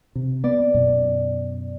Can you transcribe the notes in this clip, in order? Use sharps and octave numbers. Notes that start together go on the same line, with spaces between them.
C3
B3 D5
F#2 B2